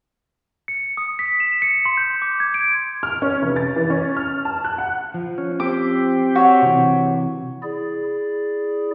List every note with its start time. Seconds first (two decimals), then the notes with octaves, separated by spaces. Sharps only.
0.68 C#7
0.97 D#6
1.19 B6
1.40 E7
1.62 C#7
1.85 C6
1.97 G6
2.22 D6
2.40 G#6
2.54 D7
3.03 F6
3.22 C#4
3.42 F1
3.56 A6
3.76 E3
3.90 C#4
4.17 F6
4.45 A5
4.64 F#6
4.78 F#5
5.14 F3
5.38 C#4
5.60 C4 G4 D6
6.35 F#4 C#5
6.62 C3 E3
7.63 E4 G#4 D5